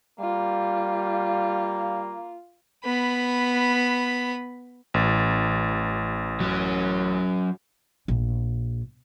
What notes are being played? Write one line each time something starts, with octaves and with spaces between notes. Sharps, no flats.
G3 A#3 F4
B3 B5
A1
F#3 C#4
A#1